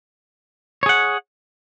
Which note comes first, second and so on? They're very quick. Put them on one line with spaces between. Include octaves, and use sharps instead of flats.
C#5 G#4 F#5